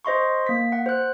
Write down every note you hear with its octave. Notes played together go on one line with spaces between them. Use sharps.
C5 D#5 C6 C#6
A#3 B6
F#5
C5 F#6